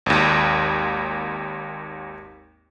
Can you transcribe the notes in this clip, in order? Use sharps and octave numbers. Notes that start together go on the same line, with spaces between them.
G#1 D#2